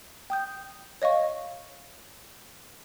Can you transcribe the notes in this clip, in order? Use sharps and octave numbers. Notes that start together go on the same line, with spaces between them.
G5 D#6 G6
C#5 D#5 F5 C#6